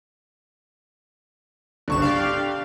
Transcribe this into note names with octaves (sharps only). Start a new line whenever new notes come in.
G1 C2 D3 C#6 E7
G4 D5 F5